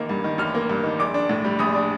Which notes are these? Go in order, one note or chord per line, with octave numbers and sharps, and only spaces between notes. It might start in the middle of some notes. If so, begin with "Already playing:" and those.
Already playing: A1 D#3 A#3
G2
D#3
A1 F6
A#3
G2
D#3
A#1 D6
D4
A2
G3
A#1 D#6
D4